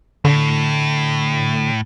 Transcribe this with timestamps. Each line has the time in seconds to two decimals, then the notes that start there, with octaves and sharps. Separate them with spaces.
0.25 A2 D3